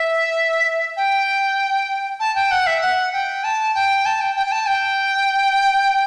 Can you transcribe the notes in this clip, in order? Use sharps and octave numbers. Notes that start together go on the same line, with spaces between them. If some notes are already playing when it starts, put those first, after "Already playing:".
Already playing: E5
G5
A5
G5
F#5
E5
F#5
G5
A5
G5
A5
G5
G5
G5
A5
G5